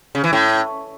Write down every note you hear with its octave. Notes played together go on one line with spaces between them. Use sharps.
C#3
E3
A2